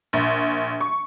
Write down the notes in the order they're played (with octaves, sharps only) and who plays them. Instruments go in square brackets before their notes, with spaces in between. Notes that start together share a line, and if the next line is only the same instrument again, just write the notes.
[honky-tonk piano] A#1
C#6